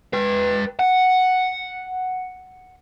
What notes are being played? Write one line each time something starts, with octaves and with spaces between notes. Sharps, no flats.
B4 G5
F#5